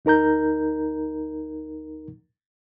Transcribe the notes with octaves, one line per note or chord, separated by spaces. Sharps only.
D2 D#4 A#4 A#5 G6